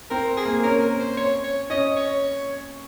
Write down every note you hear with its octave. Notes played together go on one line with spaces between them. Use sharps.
C4 A#4
G#4
A#3
C#4 A#4
A#4
C5
C#5
C#5
C#4 D#5
C#5